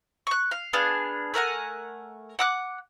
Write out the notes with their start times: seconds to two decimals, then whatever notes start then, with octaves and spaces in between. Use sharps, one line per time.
0.27 C#6 F#6
0.51 F5
0.73 B3 D4 G#4 F5
1.34 A3 A#4 F#5 G#5
2.39 F#5 D6 F#6